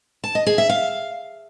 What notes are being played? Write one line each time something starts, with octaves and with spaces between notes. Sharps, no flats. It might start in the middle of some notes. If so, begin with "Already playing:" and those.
A5
D#5
G#4
E5
F5